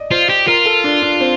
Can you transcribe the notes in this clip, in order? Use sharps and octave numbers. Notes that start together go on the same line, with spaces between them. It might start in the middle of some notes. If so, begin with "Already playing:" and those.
Already playing: D5 D#5
F4 C5
G4
F4 A#4
A4
D4
D4
C4